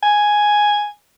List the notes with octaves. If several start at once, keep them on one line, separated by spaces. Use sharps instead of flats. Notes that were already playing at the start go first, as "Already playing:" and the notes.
G#5